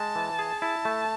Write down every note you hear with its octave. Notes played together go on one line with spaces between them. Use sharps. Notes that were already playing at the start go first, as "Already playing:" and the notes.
Already playing: G#3 A5
E3
G#4
E4 A5
A3